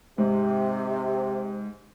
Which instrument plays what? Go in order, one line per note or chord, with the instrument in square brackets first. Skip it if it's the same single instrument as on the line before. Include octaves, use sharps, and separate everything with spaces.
[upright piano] G#2 [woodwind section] C3